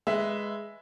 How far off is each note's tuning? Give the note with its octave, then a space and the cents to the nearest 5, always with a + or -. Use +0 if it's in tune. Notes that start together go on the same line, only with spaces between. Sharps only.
G#3 +0 B4 +0 E5 +5